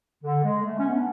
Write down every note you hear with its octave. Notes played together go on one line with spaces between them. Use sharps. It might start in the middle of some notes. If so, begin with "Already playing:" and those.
D3
G#3
A3
C#4
B3
D4